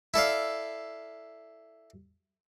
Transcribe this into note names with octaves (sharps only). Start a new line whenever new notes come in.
E4 A4 D5 F5